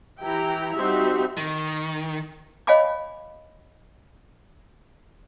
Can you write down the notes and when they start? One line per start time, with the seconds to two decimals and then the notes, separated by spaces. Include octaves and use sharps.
0.21 E3 E4 G4 G5 A#5
0.75 G3 C4 D#4 F#4 G4 E5
1.37 D#3
2.67 C#5 D#5 F5 G#5 B5 D6